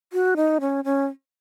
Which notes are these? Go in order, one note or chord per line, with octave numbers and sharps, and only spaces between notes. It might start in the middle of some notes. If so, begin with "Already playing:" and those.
F#4
D#4
C#4
C#4